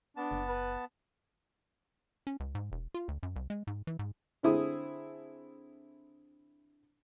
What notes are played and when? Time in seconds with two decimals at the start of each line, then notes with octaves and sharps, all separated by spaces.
0.17 B3 D4 A5
0.31 F#1
0.48 B4
2.27 C#4
2.40 C#2
2.55 G#2
2.72 E1
2.94 F4
3.08 D2
3.23 F#2
3.36 C2
3.50 G#3
3.67 G#2
3.87 E3
3.99 G#2
4.43 D3 C4 E4 G#4 D#6